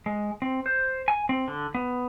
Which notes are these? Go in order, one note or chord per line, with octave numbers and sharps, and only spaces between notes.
G#3
C4
C5
G#5
C4
D3
B3